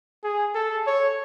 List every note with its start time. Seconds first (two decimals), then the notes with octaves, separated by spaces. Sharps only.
0.24 G#4
0.55 A4
0.87 C#5